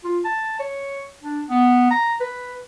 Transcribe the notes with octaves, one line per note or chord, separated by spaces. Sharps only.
F4
A5
C#5
D4
B3
A#5
B4